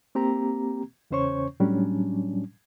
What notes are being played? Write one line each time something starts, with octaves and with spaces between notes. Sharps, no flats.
A#3 C4 G4 A#5
E2 C#3 C#4 C5 C#5 C#6
A2 F#3 G3 C#4 D4